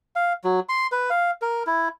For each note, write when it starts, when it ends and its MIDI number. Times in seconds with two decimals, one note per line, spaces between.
0.16 0.33 77
0.44 0.60 54
0.69 0.87 84
0.92 1.10 71
1.10 1.31 77
1.42 1.63 70
1.67 1.89 64